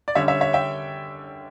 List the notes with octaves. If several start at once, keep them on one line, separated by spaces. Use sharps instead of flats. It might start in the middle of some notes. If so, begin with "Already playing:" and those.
D5
D3 G3 C#4 C#5 E5
C#5 E5
C#5 E5
E5 G5